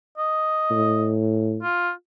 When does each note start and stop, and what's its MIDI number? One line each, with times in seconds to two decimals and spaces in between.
0.18 1.12 75
0.70 1.62 45
1.63 1.91 65